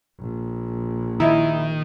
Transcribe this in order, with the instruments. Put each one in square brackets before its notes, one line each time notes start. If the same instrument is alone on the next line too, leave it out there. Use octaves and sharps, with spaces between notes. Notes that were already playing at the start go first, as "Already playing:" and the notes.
[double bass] A#1
[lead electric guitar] D#3 [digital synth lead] E4 [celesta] D#5 E5 A#5